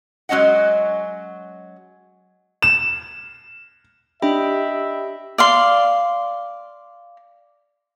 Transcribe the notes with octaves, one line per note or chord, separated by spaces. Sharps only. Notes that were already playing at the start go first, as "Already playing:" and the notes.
F#3 G#3 C#4 D#5 F#5
E7
D4 G4 D#5 E5 G5 B5
D5 F5 C6